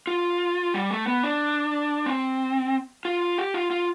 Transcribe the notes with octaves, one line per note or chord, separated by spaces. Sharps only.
F4
G3
A3
B3
D4
C4
F4
G4
F4
F4